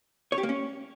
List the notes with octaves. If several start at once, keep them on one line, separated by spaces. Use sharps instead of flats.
C#5
G4
A#3
C#4